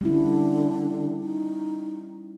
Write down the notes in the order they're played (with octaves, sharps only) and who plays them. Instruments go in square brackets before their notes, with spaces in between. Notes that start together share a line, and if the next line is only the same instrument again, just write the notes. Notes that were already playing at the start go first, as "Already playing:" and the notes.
[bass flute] D3 [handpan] G3 C#4 E4
[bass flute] D#4